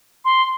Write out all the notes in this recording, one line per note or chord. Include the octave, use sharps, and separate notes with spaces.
C6